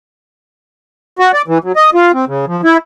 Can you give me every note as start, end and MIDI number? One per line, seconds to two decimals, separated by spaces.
1.19 1.32 66
1.34 1.42 74
1.48 1.58 52
1.64 1.72 54
1.76 1.90 75
1.94 2.12 65
2.13 2.25 60
2.28 2.45 49
2.47 2.61 53
2.64 2.77 64